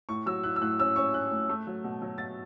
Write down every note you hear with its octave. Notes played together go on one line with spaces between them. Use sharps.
A2 C#6
F#3 E6
E4 F#6
E6
A2 F#6
C#4 E6
C#4 C#6
C#4 F#6
A2
A3
F#3
B2
F#3
B2 A6